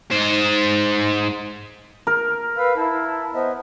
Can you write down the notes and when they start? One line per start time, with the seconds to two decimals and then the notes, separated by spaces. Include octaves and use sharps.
0.11 G#2 C5
2.07 A#4
2.57 B4 F5 E6
2.77 E4 A5
3.34 B3 C5 D#5 E5